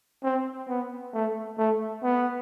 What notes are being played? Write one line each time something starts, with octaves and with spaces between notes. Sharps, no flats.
C4
B3
A3
A3
B3